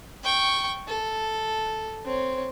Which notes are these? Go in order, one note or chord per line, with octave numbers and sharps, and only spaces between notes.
G5 C#6
A4
C4 C#5